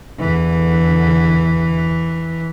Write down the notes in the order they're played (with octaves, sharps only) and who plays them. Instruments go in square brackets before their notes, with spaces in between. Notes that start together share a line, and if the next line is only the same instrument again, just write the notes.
[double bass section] E2 D3 [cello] E3